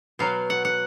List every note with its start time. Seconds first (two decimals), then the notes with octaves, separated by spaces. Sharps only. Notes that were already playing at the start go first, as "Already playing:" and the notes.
0.19 B2 F#3 F5
0.50 F#5
0.65 F#5